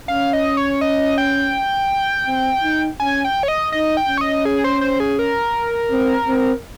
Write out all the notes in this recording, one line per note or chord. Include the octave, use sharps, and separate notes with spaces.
C#4 F5
D#5
C#5
D#5
G5
C4
D#4
C#4 G#5
G5
C#5
D#5
D#4 D#5
G5
C#4
C#5
D#5
G#4
C5
C5
G#4
A#4
C4
C4